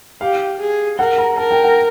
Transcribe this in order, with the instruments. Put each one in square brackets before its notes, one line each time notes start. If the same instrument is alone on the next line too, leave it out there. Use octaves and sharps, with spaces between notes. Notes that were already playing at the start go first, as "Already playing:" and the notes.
[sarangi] G4 [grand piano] F5
[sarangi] G#4
[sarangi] A#4 [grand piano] F#5
[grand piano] A#5
[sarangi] A#4 [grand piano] A5
[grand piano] G5
F#5